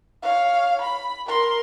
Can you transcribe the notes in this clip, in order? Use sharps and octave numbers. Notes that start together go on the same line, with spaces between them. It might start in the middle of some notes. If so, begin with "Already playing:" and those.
C#5 F5
B5
A#4 C6